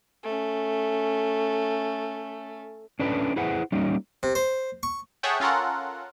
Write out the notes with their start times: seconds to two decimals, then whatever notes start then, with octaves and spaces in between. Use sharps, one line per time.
0.24 A3 C#4
2.99 C#4 D4 A4 B4 D5
3.36 E4 G#4 B4 C5 F#5
3.72 G3 A#3 C#4 D#4
4.23 C3
4.35 C5
4.83 C#6
5.23 G#4 A4 C#5 E5 F#5 G5
5.40 C#4 F4 A4 A#4 F#5